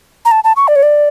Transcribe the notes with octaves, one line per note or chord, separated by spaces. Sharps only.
A#5
A5
A5
C#6
D5
C#5
D5